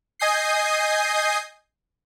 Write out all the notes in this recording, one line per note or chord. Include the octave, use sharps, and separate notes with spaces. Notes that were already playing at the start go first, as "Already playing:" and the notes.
D#5 G#5 D#6 G6 C7